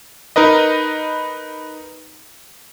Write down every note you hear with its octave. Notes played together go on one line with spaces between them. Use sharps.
D#4 A#4 B4 D#5